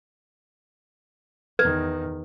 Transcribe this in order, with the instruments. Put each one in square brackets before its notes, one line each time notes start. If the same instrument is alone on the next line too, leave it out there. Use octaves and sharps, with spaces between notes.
[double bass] E2 D#3 [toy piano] B4 [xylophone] G#6